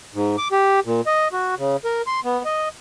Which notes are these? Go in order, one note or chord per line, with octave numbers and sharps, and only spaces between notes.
G#2
D6
G4
A#2
D#5
F#4
C#3
A#4
C6
B3
D#5